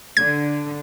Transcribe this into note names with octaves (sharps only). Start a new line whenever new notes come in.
D3 G#6